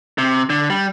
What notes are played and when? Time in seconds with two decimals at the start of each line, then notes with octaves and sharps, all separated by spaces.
0.18 C3
0.50 D3
0.70 G3